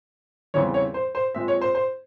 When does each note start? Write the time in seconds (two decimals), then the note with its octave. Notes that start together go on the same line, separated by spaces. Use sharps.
0.54 E2 C#3 E3 G3 C4 C#5
0.74 C#5
0.94 C5
1.15 C5
1.35 A#2 G#3 C4 E5
1.48 C#5
1.61 C5
1.75 C5